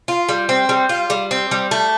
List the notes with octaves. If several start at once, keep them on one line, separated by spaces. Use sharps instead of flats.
F4
G3
C4
G3
F4
G3
C4
G3
A3